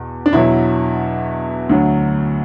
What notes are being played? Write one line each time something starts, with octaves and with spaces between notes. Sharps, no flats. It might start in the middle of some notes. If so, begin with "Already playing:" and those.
Already playing: E2 B2
D4
E2 B2 F#3 E4
D2 D3 F#3